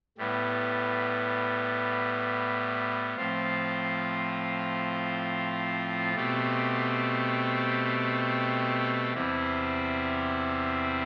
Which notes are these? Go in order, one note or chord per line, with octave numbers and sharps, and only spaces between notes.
A2 G3 B3
A2 F3 C4 F4
B2 A3 C4 G4
E2 C3 G3 C4 E4